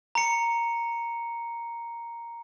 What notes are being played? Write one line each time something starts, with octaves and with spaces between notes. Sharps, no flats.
A#5 C#7